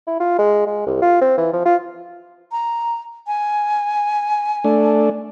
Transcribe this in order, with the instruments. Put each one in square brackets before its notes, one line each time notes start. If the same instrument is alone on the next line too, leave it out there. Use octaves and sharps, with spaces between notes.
[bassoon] E4
F4
G#3
G#3
C2
F4
C4
E3
F3
F4
[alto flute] A#5
G#5
[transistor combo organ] A3 D4